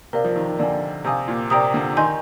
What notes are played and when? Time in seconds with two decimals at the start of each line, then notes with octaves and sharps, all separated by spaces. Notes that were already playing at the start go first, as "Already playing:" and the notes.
0.13 C3 A#4 D5 F5
0.24 F3
0.36 D#3
0.48 D#3
0.59 D3 D5 F5 G#5
1.04 C3 F5 G#5 D#6 G6
1.28 A#2
1.50 C3 A#4 D5 G5 A#5 D#6
1.74 D3
1.97 D#3 D#5 G#5 C6 G6